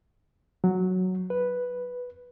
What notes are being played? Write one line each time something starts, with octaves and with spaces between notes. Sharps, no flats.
F#3
B4